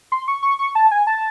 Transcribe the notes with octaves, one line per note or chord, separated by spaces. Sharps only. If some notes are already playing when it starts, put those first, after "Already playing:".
C6
C#6
C#6
C#6
A5
G#5
A5